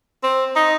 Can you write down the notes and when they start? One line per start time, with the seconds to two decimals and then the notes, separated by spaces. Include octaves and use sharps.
0.24 C4
0.56 D#4